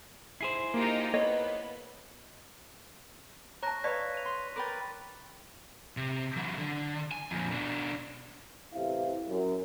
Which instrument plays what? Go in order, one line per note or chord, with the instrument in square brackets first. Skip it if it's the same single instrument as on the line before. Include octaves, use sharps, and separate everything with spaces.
[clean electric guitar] E4 G#4 C5 [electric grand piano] C7
[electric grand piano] A#3 [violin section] D#4 F4 G4
[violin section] B3 [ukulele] C#5 D#5
[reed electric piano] C#5 [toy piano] A5 A#5 [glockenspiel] C#6 F#6 A#6
[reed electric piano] B4 C#5 A5 [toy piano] D5 [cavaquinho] E5 F5 [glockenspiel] B6
[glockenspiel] D#7 F7
[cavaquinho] C6
[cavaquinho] A#4 B4 G5 [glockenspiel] D6 A6
[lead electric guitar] C3
E3 F#3
D3
G#5
F2 A#2
B2 D4
[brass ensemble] A1 C3 E4 F5
F#2